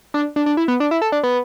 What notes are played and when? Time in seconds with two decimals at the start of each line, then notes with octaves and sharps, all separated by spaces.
0.14 D4
0.36 D4
0.46 D4
0.57 E4
0.68 B3
0.80 D4
0.91 E4
1.02 A4
1.12 D4
1.23 B3